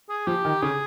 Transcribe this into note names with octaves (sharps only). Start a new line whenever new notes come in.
G#4
F3 G4
D#3
C#3 G#4